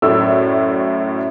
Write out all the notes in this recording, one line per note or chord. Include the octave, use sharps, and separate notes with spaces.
F#2 A2 A3 D5 E6